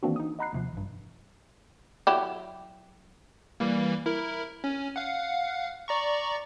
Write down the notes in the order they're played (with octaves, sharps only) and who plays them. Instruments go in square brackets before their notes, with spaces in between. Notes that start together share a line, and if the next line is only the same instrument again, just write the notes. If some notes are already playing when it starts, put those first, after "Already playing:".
[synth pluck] D#3 E3 A#3 C4 D4 F#4
D#4 D#6
D#5 F#5 A#5 B5 F#6 C7
D#2 C3 F3
A1 G2
[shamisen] F#3 E4 G4
[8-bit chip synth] E3 G3 A#3
E4 A#4
C#4
F5 F#5
D5 A#5 C#6